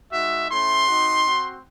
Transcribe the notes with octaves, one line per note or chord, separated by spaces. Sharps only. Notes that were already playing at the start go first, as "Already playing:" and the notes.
G#3 D#4 F#4 E5
A3 C#4 E4 C6
C4 D#4 F#4
C4 F#4